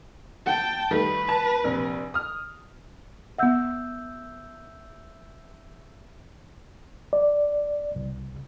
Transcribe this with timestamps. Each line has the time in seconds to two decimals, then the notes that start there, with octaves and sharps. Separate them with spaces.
0.46 G5 A5
0.91 D#3 G3 A3 B4
1.29 A5
1.64 A#1 C3
2.14 D#6 F6
3.38 B3 E5 F#5 E6 G6
7.13 D5
7.96 C2